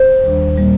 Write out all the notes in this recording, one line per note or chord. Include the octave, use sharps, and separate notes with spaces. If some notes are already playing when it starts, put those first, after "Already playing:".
Already playing: C5
D#2 D#3 G3 D4
A#2 G3 A#3